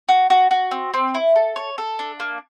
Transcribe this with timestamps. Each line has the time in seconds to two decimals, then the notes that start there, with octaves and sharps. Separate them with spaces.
0.09 F#4
0.30 F#4
0.51 F#4
0.71 C4
0.94 C4
1.15 E4
1.36 A4
1.56 C#5
1.78 A4
1.99 D4
2.20 A#3